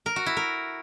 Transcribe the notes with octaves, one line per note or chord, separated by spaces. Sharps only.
A#4
F#4
E4
A#4